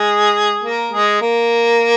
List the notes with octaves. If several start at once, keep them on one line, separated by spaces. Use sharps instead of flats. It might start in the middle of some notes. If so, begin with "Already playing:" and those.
Already playing: G#3 G#4
A#3 A#4
G#3 G#4
A#3 A#4